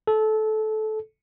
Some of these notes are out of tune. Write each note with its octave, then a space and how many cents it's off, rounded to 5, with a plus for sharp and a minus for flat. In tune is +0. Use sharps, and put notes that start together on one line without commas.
A4 -20